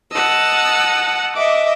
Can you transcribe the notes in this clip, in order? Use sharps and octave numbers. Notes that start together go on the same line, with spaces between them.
D#5 F#5 A5 E6
D#5 E5 D6